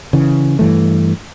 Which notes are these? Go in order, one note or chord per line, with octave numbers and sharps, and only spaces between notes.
C#3 E3
G2 E3 A3